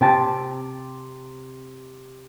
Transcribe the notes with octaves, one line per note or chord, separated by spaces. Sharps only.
C3 G5 A5